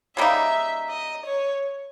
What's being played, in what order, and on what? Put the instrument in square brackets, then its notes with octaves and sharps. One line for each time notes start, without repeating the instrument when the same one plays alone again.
[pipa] C#3 G3 A#3 D#4 [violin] E5
[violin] D#5
C#5